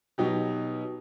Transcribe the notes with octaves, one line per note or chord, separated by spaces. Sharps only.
B2 F#3 D#4 G4